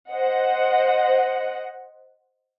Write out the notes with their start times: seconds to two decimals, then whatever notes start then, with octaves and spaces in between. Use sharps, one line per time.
0.11 C5 D#5 F#5